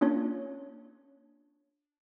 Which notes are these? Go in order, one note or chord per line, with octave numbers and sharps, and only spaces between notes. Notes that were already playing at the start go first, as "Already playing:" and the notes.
A#3 C#4 D4 F4 C#5